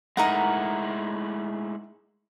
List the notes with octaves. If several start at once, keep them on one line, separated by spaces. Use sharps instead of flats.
G#3 A3 D#4 E4 A#4 F#5